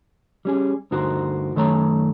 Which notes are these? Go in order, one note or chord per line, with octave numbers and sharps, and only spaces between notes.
G3 C#4 G#4
D2 G2 D#4 F#4 A#4 C5
F#2 D#3 A3 B4 C#5 A#5